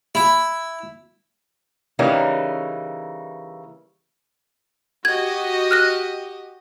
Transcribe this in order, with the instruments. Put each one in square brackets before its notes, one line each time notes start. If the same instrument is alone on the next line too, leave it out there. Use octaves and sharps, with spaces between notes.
[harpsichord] E4
[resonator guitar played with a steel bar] C#3 E3 G3 A#3 C#4 D#4
[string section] F#4 G4 D#5 [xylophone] G#6
[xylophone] F6 F#6 A#6